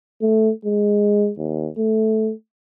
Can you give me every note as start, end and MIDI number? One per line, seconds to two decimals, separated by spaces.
0.22 0.51 57
0.65 1.31 56
1.38 1.69 39
1.78 2.32 57